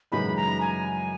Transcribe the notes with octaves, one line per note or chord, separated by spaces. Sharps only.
F#2 C#3 E3 G#3 D#4 B5
A#5
G#5